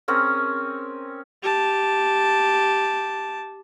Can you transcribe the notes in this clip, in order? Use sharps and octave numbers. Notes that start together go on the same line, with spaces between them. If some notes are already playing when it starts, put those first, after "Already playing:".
C4 C#4 G#4 A#4
G4 A5